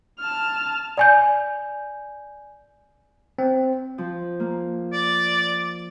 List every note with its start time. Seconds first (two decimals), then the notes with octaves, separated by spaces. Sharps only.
0.20 A5 F6
0.97 D5 G#5 G6
3.39 C4
3.98 F3
4.40 A#3
4.93 D5